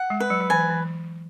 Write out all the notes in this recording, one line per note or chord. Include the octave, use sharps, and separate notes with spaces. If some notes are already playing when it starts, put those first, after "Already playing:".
Already playing: F#5
G#3
B4
F#3
F#3
E3 G#5
E3